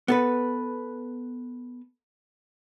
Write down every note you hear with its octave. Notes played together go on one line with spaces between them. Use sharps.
B3 A4 B4